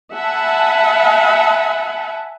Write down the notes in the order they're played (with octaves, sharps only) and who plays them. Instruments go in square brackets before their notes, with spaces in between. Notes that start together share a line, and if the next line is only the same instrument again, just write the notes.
[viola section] E5 F#5 G#5 A5 B5